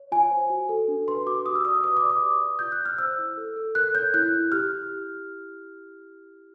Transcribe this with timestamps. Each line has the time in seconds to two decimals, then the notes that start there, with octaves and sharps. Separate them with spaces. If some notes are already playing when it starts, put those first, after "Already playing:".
Already playing: C#5
0.12 F4 G#5
0.31 C5
0.50 F#4
0.69 A4
0.88 D4
1.07 B4 C6
1.26 F#4 D6
1.46 G4 D#6
1.55 E6
1.65 D5 D#6
1.74 D6
1.84 B4 D#6
1.97 D6
2.03 D5
2.10 D#6
2.22 G4
2.41 D5
2.59 F4 G6
2.72 F#6
2.79 F4
2.86 F6
2.98 C5 E6
3.18 E4
3.37 A4
3.56 A4
3.75 A#4 F#6
3.94 C#5 G6
4.14 E4 F#6
4.33 E4
4.52 G4 F6